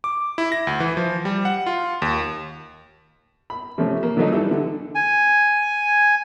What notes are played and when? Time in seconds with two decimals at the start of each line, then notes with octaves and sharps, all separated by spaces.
0.04 D6
0.38 E4
0.52 A#6
0.67 D2
0.80 E3
0.97 F3
1.25 G3
1.45 F#5
1.67 F4
2.02 D#2
3.50 B5
3.78 C3 F3 A3 C#4
4.03 A#3
4.17 D3 F3 F#3 A3 D#4
4.32 E3 G3 A4
4.51 D3
4.95 G#5